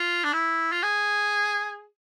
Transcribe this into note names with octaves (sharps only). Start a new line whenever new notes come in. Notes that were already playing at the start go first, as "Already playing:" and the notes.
Already playing: F4
D4
E4
F4
G#4